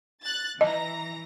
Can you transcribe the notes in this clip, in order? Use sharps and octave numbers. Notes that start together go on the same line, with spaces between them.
F#6 A6
E3 D#5 A#5 A#6